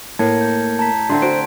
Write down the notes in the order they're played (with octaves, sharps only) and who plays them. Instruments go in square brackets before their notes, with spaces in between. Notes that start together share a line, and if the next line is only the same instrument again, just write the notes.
[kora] A2 [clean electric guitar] A#3 [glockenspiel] A5 G#6 C#7
[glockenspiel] G6
A5 A#5 B6
[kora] D3 A3 C4 [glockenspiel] A5 C6
[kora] F#4 [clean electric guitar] C5 [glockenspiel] D7